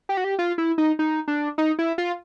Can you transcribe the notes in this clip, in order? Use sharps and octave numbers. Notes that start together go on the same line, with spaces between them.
G4
F#4
G4
F4
E4
D#4
D#4
D4
D#4
E4
F4